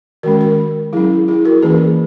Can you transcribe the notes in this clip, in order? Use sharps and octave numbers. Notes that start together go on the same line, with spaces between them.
D#3 G#3 C#4 F#4 A#4
F#4 A#4
F#3 C#4 E4 G#4
E4 G#4
F#4 A#4
E3 A#3 C#4 G#4 B4